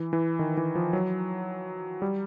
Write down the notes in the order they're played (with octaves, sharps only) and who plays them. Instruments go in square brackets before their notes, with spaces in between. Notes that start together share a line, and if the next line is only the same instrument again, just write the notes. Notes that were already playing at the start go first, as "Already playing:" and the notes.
Already playing: [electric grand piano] E3
E3
D#3
E3
F3
F#3
G3